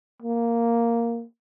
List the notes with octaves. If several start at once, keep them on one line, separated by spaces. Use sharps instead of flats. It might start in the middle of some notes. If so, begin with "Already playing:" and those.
A#3